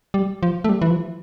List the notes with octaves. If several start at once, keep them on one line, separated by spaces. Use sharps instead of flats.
G3
F3
A3
G3
E3
F3